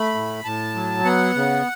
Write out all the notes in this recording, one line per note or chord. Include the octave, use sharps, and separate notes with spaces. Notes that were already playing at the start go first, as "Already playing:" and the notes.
Already playing: A3 B5
A2
A2 A5
F#3
B3 F#5
C#3